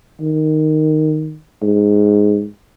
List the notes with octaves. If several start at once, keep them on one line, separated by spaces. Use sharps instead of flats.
D#3
G#2